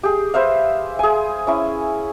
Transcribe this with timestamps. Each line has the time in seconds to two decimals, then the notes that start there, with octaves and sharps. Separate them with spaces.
0.03 G4 G#4
0.34 B4 C5 E5 F5
0.99 G#4 G#5
1.47 C#4 E4